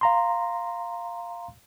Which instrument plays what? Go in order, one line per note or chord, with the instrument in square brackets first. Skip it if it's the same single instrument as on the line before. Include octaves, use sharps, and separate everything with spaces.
[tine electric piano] F5 A#5 C6